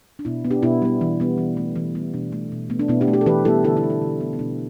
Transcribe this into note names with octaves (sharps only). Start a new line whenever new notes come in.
D4
B2 B3 E4
B3
D4 G4
B2 B3 E4
G3 B3
E3
G3 B3
E3
A3
E3
G3 B3
B2 D4
A3
B2
A3 B3
D4
B2 B3 E4
D4 G4
A3
D4 G4
A4
E3 G4 B4
G3 B3 E4 A4
D3 E4 A4
B3 E4
A3
D4
D3
B3
B3
B2 D4